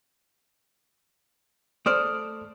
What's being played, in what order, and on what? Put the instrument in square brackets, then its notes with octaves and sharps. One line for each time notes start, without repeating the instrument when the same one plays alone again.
[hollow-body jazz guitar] A3 C5 D5 [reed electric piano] D#6 F6